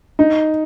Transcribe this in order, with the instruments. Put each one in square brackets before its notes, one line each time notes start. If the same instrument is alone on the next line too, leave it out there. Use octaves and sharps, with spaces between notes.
[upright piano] D#4